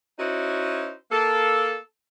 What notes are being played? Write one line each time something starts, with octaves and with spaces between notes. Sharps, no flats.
C#4 D#4 E4 F#4 C5
A#3 A4